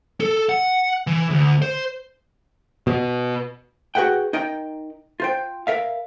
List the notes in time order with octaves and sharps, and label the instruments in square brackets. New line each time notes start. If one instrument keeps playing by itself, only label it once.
[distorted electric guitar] A4
F#5
E3
D2
C5
[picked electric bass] B2
[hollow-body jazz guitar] F#4 G#4 B4 F#5 G5
D#4 A#4 D#5 G5
F4 C5 G5
A#4 E5 F5